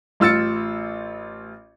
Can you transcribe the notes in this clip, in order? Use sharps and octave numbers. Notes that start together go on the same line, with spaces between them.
A1 F4 E6 A6 C#7